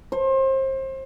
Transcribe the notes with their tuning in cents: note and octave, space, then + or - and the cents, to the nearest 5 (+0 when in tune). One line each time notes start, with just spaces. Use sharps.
C5 +30